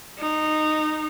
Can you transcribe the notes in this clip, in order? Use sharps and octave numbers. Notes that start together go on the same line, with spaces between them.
D#4